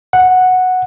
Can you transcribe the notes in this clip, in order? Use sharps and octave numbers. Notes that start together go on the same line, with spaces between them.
F#5